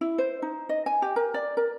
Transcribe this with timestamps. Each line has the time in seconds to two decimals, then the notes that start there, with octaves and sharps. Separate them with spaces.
0.01 E4
0.18 C5
0.42 D#4
0.69 D#5
0.86 G#5
1.02 G4
1.16 A#4
1.34 D5
1.57 A#4